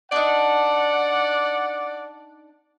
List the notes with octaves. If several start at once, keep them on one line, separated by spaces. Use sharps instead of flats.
D4 D#4 D5 F#5